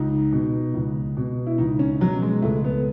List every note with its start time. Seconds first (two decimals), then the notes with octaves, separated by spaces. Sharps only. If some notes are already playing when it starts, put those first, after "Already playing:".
Already playing: C#2 D#4
0.32 B2
0.74 C#2
1.17 B2
1.46 E4
1.58 C#2 D#4
1.79 C#4
2.00 B2 F#3
2.22 G#3
2.42 C#2 A3
2.64 B3